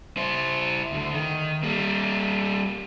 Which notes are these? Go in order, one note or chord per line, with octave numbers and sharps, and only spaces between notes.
E4 C5
D2 D3
D#3
G3 A#3